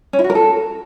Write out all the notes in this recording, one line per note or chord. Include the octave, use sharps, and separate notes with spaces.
C#4
E4
F#4
A#4
A4